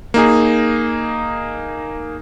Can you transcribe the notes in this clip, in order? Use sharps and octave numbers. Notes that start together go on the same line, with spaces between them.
A#3 D#4 G#4